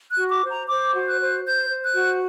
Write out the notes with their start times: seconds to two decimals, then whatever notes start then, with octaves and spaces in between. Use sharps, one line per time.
0.11 F#6
0.18 F#4
0.31 D6
0.44 C5
0.50 A#5
0.69 C5 D6
0.94 F#4
1.06 F#6
1.20 C5
1.45 C5 G6
1.69 C5
1.82 F#6
1.95 F#4